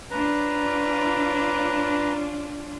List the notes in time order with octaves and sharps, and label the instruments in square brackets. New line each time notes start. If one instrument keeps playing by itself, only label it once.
[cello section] C#4 D4 F4 [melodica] B4 A#5